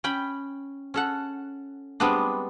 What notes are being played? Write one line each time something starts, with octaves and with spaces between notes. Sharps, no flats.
C#4 G5 B5
C#4 A4 F#5
G3 G#3 B3 C4 D4